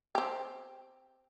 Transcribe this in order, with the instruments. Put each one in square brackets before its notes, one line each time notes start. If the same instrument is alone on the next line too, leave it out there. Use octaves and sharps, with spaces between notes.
[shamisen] C4 G4